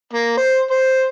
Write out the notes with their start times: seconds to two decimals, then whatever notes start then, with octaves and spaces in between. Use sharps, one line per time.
0.13 A#3
0.37 C5
0.70 C5